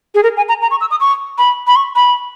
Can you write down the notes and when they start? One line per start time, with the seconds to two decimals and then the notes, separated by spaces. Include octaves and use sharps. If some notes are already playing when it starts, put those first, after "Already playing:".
0.15 G#4
0.23 A#4
0.37 G#5
0.49 A#5
0.62 A#5
0.71 C#6
0.81 E6
0.91 D#6
1.00 C#6
1.38 B5
1.67 B5
1.76 C#6
1.96 B5